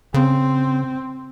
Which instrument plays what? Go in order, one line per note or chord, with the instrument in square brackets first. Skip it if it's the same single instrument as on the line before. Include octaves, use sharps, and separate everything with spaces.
[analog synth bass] C#3 [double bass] C4